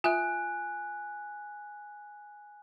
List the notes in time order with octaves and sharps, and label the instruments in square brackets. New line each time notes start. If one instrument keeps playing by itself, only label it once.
[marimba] F4 E5 [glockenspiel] G#5 F#6